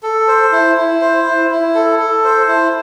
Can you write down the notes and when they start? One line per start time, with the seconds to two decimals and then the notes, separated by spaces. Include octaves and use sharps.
0.03 A4
0.28 C5
0.52 E4
0.77 E4
1.01 C5
1.26 E4
1.51 E4
1.75 A4
1.99 A4
2.24 C5
2.48 E4